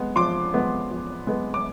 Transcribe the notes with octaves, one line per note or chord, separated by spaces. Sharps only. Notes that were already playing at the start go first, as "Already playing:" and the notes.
Already playing: G#3 B3
F3 C6 D6
G#3 B3
F3
G#3 B3
D6